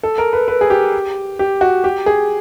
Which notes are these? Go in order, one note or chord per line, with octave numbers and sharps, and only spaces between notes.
A4
A#4
B4
B4
G#4
G4
G4
F#4
G4
G#4